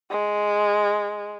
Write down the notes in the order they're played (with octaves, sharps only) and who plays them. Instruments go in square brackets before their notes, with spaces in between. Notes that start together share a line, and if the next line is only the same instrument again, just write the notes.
[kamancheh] G#3